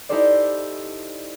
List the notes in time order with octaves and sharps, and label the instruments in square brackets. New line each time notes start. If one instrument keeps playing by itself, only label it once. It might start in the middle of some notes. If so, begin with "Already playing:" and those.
[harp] D#4 E4 G4 A4 C5 D5